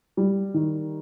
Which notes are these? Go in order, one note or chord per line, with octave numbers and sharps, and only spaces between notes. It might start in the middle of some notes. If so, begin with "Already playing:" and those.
G3
D#3